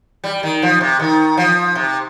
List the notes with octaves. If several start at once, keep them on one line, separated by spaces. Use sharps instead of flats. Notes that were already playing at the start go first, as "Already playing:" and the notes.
G3
D#3
F3
C3
D#3
F3
C3